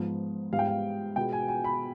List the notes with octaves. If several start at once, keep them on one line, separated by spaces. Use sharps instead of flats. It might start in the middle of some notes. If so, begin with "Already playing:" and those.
Already playing: G#2 F3 B3
G#2 G3 B3 F5
G5
F5
B2 G#3 B3 G5
G#5
G#5
B5